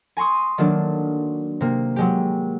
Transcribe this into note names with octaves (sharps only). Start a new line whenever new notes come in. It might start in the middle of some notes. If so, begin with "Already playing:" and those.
G#5 A#5 C6 C#6 D#6
D#3 F#3 A3 A#3 D4
C3 A#3
F#3 G#3 G4